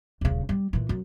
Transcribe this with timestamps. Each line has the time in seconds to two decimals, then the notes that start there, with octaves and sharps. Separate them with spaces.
0.21 D#1 C#3
0.49 G3
0.73 A#2 E3
0.89 F#2